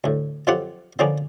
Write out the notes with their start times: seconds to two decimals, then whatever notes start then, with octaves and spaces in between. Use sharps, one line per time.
0.04 D2 A2
0.47 F2 F#3 C4 F4 G4 F#5
0.99 D3 F3 A#3 B3 C#4 D4